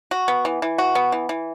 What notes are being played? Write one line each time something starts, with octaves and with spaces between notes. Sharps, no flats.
F#4
B3
E3
E3
F#4
B3
E3
E3